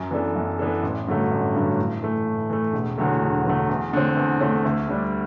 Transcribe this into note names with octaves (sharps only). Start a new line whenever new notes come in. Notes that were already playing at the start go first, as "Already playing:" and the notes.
Already playing: F#2
E3 B3 D4 A4
F#2
E3 B3 D4 A4
A1
G2 D3 F#3 A3
A1
G2 D3 F#3 A3
A2
E3 A3
A2
E3 A3
E1
E2 D3 F#3 A3
E1
E2 D3 F#3 A3
E2
D3 A3 C4
E2
D3 A3 C4
D2
D3 G3 D4